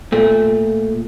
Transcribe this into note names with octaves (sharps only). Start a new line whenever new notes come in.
A#2 A3